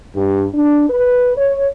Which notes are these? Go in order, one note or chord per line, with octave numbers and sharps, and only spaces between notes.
G2
D4
B4
C#5